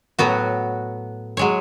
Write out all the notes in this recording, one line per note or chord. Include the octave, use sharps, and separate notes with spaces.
A2 F#3 B3 F#4
F#3 G#3 C#5